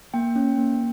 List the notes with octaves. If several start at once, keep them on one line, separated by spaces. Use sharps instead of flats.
A#3 G5
C#4
A#3